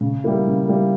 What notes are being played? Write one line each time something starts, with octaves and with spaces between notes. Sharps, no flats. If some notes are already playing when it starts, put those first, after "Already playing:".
C#3
G3 A#3 E4
C#3
G3 A#3 E4